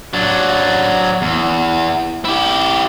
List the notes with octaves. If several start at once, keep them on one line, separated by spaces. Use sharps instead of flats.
F#3 D4
E2
E4 G4